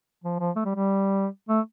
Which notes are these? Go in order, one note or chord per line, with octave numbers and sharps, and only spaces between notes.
F3
F3
A3
G3
G3
A3